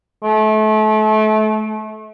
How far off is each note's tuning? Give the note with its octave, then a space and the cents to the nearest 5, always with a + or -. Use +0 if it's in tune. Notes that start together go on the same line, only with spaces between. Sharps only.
A3 -30